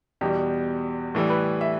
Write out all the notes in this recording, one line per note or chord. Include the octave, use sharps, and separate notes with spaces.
E2 B2 G3 G4
A2 E3 G3 A4
B4
E5